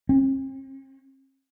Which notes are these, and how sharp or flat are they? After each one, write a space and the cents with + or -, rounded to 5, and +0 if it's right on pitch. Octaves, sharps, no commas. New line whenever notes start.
C4 +45